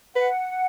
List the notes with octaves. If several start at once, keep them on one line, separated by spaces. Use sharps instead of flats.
B4 F#5